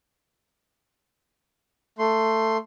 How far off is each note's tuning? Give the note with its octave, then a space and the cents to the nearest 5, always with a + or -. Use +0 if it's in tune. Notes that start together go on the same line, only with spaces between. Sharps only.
A3 +15 C6 +0